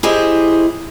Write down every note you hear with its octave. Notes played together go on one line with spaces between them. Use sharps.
E4 G4 G#4 C5 D#5